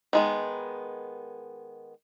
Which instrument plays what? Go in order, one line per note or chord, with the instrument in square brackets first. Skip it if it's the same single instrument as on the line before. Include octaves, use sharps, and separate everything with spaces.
[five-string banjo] D#3 G#3 B3